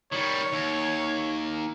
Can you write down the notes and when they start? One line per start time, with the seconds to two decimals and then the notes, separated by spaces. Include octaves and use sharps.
0.12 D#3 G3 C#5
0.53 D#2